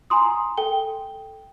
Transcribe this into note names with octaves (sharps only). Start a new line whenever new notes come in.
G#5 A#5 C6 D#6
A4 G5 G7